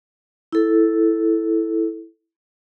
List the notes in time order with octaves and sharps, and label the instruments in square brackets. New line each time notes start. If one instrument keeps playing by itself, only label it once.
[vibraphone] E4 A4